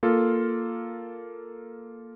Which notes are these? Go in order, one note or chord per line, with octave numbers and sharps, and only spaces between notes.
A#3 F4 A4